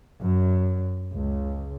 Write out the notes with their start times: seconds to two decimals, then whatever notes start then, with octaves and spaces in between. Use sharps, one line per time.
0.21 F#2
1.12 C#2